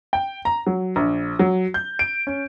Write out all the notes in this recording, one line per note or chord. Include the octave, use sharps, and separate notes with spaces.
G5
A#5
F#3
A#1
F#3
G6
D7
C#4